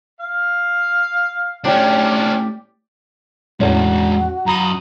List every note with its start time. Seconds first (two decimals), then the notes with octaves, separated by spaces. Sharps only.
0.21 F5
1.64 A2 C#4 D4 G4 D5
3.60 E2 A2 E3 G#3 C#4 F#4
4.46 F#2 A#5 B5 D#6